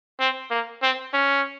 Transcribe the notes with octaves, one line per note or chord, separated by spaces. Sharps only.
C4
A#3
C4
C#4